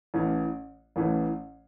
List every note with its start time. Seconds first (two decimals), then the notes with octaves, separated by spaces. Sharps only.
0.14 A1 A2 E3 C#4
0.96 A1 A2 E3 C#4